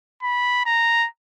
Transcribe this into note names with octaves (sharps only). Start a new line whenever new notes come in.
B5
A#5